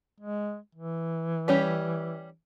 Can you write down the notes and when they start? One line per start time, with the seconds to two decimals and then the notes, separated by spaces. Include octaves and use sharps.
0.21 G#3
0.75 E3
1.48 G3 C#4 G4